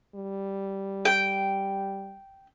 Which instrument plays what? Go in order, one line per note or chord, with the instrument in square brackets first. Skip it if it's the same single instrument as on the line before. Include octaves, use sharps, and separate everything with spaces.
[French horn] G3
[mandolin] G5